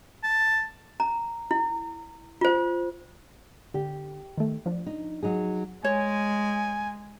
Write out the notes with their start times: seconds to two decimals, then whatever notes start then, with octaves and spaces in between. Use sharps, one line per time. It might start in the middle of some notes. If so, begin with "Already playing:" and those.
0.23 A5
1.00 A#5
1.51 E4
2.41 F4 C5
3.74 D3 G4
4.37 D#3 A3
4.66 F3 D4
4.86 D#4
5.23 F#3 D#4 G#4
5.84 G#3 C#5 G#5